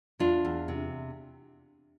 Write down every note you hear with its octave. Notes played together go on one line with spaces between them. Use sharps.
E2 D4 F4
E2
C3